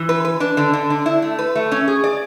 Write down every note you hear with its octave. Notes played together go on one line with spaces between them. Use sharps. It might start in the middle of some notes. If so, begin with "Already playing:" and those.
Already playing: E3
B4
B4
D4
D3
D3
D4
E4
A3
B4
A3
C#4
G#4
D5